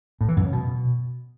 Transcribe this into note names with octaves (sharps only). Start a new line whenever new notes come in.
A2
E3
F#2
C#3
B2